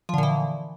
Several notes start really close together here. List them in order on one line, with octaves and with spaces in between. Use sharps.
F3 D3 A#2 E3